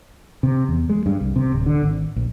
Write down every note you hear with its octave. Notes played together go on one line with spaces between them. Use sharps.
C3
E2
G#3
G2
C2
C3
D1
D3
G#1
A#1